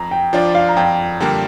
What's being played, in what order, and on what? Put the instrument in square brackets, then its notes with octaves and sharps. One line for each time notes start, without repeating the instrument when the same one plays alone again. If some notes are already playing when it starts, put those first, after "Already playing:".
Already playing: [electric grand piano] F2 [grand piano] A#5
[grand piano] G5
[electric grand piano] F3 D4 F4 [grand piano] D5
[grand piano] F5
A#5
[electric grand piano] F2 [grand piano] G5
[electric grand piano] D3 G3 A#3 [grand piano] G5